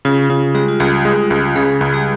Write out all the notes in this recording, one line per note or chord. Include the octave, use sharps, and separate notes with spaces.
C#3 F4
C#3 F4
G3 G#3 G4
F4
C#2 G3 G4
G#3
C#2
C#3 G#3 G#4
C#2
G3 G4